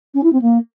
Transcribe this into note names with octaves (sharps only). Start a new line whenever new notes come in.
C#4
E4
C4
A#3